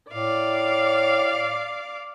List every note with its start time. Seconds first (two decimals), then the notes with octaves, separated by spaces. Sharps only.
0.12 A2 D5 F5 D6